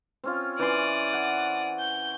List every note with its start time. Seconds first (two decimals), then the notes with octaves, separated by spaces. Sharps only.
0.24 C4 C#4 F4
0.59 E3 C#4 D5 C6 D#6
1.13 F#5
1.80 G6